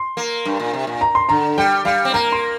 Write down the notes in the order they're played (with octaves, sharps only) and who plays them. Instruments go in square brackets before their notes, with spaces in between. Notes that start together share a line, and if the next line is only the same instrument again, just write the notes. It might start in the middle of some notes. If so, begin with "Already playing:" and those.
Already playing: [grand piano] C6
[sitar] A#3
G2
A#2
C3
A#2
[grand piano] A#5
C6
[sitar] D3 [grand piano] A#5
[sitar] G3 [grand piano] G5
[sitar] G3 [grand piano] F5
[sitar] C4
[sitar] A#3 [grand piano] A#5
[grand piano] C6